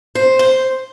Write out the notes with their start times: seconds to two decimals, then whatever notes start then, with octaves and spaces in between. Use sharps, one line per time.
0.15 C5
0.39 C5